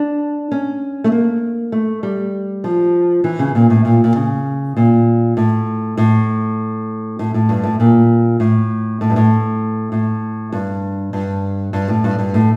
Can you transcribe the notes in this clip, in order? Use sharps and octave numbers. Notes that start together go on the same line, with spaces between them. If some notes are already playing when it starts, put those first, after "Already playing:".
Already playing: D4
C#4
A3
A#3
A3
G3
F3
E3
C#3
A#2
A2
A#2
A#2
C#3
A#2
A2
A2
A2
A2
G2
A2
A#2
A2
A2
G2
A2
A2
G2
G2
G2
A2
G2
G2
A2